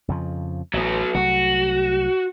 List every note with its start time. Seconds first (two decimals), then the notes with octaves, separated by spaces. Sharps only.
0.08 F2 C#3 F3
0.74 A1 F#3 B3
1.15 C2 F#3 A3 F#4